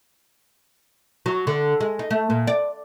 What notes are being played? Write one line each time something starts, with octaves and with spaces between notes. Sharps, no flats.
F#3
D3
G#3
D#4
A3
A#2
D5